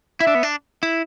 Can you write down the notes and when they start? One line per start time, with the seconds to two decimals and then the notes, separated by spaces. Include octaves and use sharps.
0.20 E4 E5
0.27 D4
0.35 B3
0.43 D4
0.83 E4